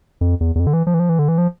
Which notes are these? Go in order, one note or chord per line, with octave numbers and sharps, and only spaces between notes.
F2
E2
E2
F2
D3
E3
F3
E3
F3
E3
D3
E3
F3